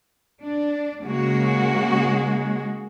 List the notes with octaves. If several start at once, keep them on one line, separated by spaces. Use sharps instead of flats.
D4
C#3 G#3 A#3 F#4